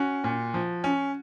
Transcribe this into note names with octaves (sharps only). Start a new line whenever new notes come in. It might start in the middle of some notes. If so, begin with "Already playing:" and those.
Already playing: C#4 F#4
A#2
F3
C#4